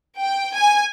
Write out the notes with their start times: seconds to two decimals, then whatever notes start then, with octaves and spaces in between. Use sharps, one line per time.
0.21 G5
0.54 G#5